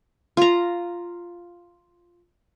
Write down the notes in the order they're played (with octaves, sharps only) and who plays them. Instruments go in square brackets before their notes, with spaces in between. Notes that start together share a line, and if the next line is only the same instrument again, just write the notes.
[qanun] F4 A#5